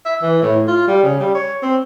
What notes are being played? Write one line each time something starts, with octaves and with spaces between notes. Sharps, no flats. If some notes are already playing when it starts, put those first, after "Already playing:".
E5
E3
A2
F4
G3
C#3
G3
C#5
C4